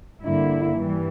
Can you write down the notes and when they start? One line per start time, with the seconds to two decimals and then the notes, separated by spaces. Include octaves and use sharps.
0.23 G2 D3 A#3 E4
0.78 G2 E3 G3